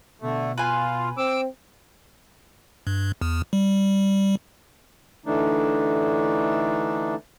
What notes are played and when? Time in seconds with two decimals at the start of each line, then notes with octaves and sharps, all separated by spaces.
0.22 B2 D3 A3
0.58 F4 B4 G#5
1.17 C4 D6 E6
2.87 G2
3.21 E2
3.53 G3
5.26 D3 E3 A3 D4 D#4